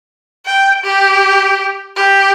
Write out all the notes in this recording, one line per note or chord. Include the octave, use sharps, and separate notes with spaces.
G5
G4
G4